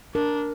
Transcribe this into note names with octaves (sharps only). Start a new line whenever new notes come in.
D4 A#4